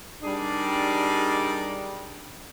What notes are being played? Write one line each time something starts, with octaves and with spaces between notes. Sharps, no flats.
G3 D4 D#4 G#4 A#4 D5